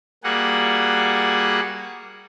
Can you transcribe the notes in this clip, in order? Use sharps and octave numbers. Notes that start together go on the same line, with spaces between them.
G3 A#3 F#4 G#4 F#5